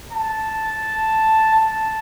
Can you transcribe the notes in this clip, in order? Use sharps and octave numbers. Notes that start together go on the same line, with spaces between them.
A5
A5